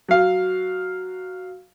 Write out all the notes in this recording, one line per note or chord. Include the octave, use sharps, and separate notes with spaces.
F#3 F5